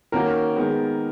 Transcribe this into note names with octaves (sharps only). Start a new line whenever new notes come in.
D#3 A#3 C#4 F#4 A#4
D#3 G#3 B3